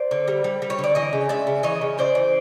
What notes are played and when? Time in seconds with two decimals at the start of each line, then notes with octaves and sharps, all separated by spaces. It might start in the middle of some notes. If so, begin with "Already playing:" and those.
Already playing: C5 D5
0.11 D3
0.28 G3
0.44 G3
0.62 G3
0.70 C#5
0.79 D3
0.84 D5
0.95 E3 C#5 D#5
1.13 C#3
1.29 G#3 D5 E5
1.47 C#3
1.63 E3 C#5 D#5
1.81 C#3
1.98 C#3 C5 D5
2.15 E3